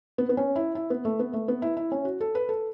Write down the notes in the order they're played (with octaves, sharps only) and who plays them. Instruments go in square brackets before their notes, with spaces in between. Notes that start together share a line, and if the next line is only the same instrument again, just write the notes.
[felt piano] B3
B3
C#4
E4
E4
B3
A3
B3
A3
B3
E4
E4
C#4
F#4
A4
B4
A4